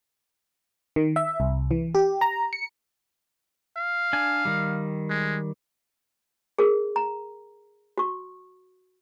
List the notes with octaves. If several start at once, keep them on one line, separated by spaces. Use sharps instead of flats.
D#3
E5
C2
E3
G4
A#5
C#7
F5
D4 G#5
D#3 G3
G#3
G#4 A#4
A#5
F#4 C#6